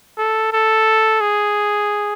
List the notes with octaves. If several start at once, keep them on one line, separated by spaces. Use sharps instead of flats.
A4
A4
G#4